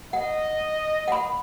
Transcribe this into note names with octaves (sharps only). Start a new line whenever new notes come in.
D#5 F#5
F#5 B5